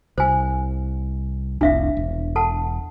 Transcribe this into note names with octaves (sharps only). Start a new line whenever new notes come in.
C2 C5 G#5
F1 C2 D4 E5 F5
E1
A4 F#5 A5